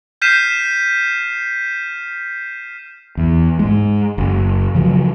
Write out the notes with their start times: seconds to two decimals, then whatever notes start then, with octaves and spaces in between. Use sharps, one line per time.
0.22 F6 G6 B6 C7 D#7 E7
3.17 E2
3.59 G#2 G#3
4.18 F#1
4.75 C#3 F3 F#3